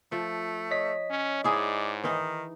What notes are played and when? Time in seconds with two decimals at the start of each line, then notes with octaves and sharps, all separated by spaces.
0.12 F3 A3
0.71 C#5 D#5 B6
1.10 C#4
1.44 G#2 E4 G#4 D5
2.04 D#3 E3 D#4